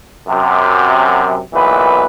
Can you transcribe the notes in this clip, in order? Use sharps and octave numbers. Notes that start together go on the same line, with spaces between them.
F#2 C3
B1 A#2 E3 B4